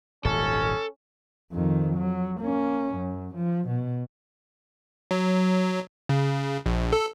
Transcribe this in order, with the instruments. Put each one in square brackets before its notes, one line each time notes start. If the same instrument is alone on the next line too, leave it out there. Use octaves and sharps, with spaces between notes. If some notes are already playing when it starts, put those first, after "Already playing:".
[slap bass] D#1 G#1 [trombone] C#4 [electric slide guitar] A4
[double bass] F2 D#3
F#3
A#3 C#4
F#2
F3
B2
[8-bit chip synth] F#3
C#3
A#1
A4